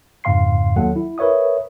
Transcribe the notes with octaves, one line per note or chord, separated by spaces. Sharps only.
F2 G#2 C#3 F5 C6 C7
D#2 F#3 A4 F#5
E4
A#4 B4 C#5 E5 D#6